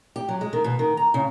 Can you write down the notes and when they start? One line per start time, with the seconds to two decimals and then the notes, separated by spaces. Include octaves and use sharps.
0.16 G4
0.29 F#3
0.41 G#3
0.53 D#3
0.64 B2
0.79 D#3
0.97 A#5
1.14 C#3